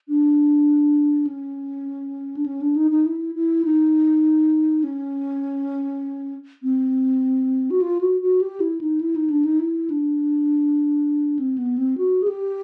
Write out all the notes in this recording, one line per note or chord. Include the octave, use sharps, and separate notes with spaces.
D4
C#4
D4
C#4
D4
D#4
D#4
E4
E4
D#4
C#4
C4
F#4
F4
F#4
F#4
G4
E4
D#4
E4
D#4
D4
D#4
E4
D4
C4
B3
C4
F#4
G#4
G4